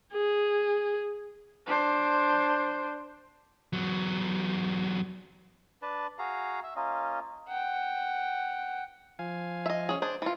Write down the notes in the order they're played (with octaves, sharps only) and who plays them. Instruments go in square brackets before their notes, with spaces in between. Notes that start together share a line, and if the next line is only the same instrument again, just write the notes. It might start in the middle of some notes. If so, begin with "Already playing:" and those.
[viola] G#4
[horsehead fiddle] D4 C5
[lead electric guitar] E2 F#3
[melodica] D4 B4 A5
F#4 G#4 F5 A#5
E5
A#3 C#4 F4 D#5
[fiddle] F#5 G5
[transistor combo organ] F3 F5 G#5
[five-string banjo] D#5 E5
C#4 G#4
D4 G#4 C5
E3 F4